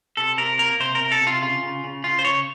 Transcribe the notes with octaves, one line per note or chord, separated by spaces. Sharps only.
C3 A4
C3 A#4
A#3 A#4
C3 C5
A#4
C3
A4
C3
F4
C#3 F4
C#3
C#3
C#3 F4
C5
C#3 C#5